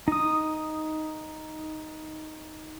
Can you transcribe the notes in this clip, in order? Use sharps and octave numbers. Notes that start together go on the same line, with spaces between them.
D#4 D#6